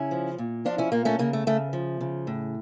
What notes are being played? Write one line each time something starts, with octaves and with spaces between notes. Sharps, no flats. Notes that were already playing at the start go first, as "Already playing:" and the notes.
Already playing: C#3 C#4 E4
F3
A#2
F3 D4 F4
C#4 E4
A#2 A#3
A3 C#4
C#3 A#3
A3
C#3 A3
F3
C#3
A2